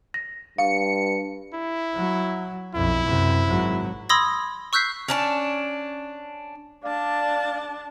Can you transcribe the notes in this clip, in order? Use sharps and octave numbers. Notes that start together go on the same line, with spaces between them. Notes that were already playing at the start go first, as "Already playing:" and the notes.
A#6
G2 F5 C#7
E4
F#3
B1 F2 E4
F#2 C3
G#1 F#3
B5 C6 D#6 E6 G#6 A#6
C#6 E6 F#6 G6 B6 C7
C#4 D4 A5
D4 D5 F5 A5